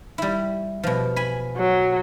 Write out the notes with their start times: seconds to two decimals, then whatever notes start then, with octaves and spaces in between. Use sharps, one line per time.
0.18 G3 E4
0.83 B2 F3
1.16 G#5 B5
1.57 F#3